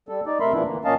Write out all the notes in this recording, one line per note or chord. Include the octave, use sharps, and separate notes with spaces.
G3 A4
D#4 D5
C3 A3 A#4 E5 B5 C6
A#2 E3 F3 B3 D4 E4
D3 E3 A#3
A#2 A#3 C#4 D#5 F5 A5